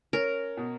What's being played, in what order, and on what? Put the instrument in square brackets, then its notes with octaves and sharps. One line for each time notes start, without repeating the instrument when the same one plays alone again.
[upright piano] C#4 [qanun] A#4
[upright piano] B2